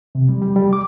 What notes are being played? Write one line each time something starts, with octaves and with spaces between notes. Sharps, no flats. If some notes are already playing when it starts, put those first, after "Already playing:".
C3
G3
G3
G3
D6